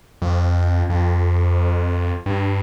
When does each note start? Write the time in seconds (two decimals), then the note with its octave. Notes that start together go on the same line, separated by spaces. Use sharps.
0.22 F2
0.89 F2
2.26 G2